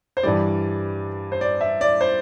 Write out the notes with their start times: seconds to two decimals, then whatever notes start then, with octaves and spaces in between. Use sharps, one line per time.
0.17 C5
0.23 G2 E3 G3 D5
1.32 C5
1.41 D5
1.61 E5
1.81 D5
2.01 C5